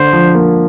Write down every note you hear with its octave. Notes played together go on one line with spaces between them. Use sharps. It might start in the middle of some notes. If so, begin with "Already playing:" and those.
Already playing: D3 C5
F3
A#3